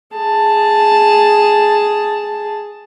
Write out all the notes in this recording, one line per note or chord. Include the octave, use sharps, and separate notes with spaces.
G#4 A5